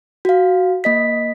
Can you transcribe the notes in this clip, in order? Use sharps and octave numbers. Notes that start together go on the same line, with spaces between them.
F#4 F5
A#3 D#5 B6